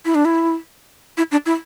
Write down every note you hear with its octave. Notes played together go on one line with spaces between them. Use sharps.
E4
D4
E4
E4
D4
E4